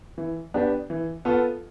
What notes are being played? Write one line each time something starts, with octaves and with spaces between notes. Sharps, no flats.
E3
B3 D4 G4
E3
B3 F4 A4